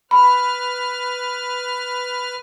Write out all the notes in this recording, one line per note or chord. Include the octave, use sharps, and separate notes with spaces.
B4 B5 F6